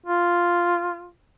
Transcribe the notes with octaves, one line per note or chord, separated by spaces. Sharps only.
F4